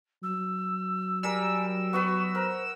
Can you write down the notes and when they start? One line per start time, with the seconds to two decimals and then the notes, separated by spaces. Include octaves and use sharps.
0.23 F#3 E6
1.23 G3 A#4 G#5 E6
1.93 B3 F#4 B4 C#6
2.35 A#4 C5